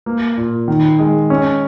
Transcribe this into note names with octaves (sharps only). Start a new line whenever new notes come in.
A#3
A#2
D#3
G#3
C#4